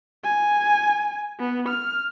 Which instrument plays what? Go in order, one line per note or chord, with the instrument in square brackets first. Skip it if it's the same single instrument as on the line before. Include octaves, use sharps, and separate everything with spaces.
[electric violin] G#5
B3
F6